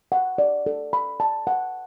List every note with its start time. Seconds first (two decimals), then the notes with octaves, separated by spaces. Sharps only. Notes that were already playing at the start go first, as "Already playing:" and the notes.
0.12 F#5
0.38 D5
0.66 A4
0.93 B5
1.20 A5
1.47 F#5